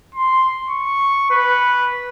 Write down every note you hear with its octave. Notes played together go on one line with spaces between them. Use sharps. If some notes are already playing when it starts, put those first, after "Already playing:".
C6
C#6
B4